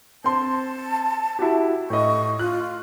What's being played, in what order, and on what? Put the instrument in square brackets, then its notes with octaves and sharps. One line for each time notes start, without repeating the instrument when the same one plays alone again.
[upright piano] C4 C6 [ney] A5
[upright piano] E4 F#4 G4
[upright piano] A2 D#5 [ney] C#6
[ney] F4 [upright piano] F#6